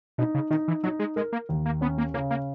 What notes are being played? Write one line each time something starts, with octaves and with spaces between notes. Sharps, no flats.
B2 D#4
C#3
D#3 D#4
E3
F#3 D#4
G#3
G#3 A#4
A#3
D#2
A#3
B3 C#4
A#3
C#3 A#3
A#3